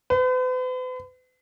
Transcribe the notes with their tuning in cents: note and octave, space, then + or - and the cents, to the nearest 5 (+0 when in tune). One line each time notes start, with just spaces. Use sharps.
B4 +45